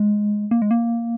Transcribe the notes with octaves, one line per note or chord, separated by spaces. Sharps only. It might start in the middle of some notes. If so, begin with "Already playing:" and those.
Already playing: G#3
A#3
G#3
A#3